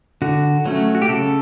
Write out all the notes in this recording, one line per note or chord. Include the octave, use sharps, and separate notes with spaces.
D3 F#4
F#3 A3 C#4
F#4
G4
C#3 A4